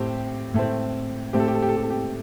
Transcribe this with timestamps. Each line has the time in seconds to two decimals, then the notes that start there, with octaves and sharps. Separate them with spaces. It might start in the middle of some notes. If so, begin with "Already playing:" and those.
Already playing: A2 A3 C4 G4
0.54 A2 A3 C4
1.33 A2 A3 C4 G4
1.40 A4
1.48 G4
1.55 A4
1.62 G4
1.69 A4
1.77 G4
1.83 A4
1.90 G4